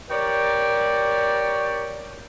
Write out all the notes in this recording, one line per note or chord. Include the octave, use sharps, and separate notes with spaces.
G4 A#4 C#5 D5